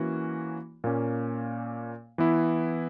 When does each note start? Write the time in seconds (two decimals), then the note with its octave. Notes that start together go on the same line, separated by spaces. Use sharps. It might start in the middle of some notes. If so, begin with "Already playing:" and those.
Already playing: E3 A#3 C#4 F#4
0.84 A#2 A#3 C#4
2.18 E3 B3 E4